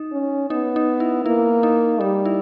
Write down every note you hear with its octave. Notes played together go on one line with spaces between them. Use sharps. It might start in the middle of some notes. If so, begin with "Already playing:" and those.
Already playing: D#4
C#4
B3 D#4
D#4
E4
A#3 E4
D#4
G3 D#4
E4